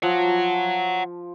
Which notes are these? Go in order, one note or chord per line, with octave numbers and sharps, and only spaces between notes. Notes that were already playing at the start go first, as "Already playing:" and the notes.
F3 C#5 F#5